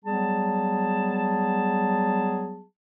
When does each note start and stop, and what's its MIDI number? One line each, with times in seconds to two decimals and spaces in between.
0.04 2.62 54
0.04 2.62 55
0.04 2.62 59
0.04 2.62 68
0.04 2.62 81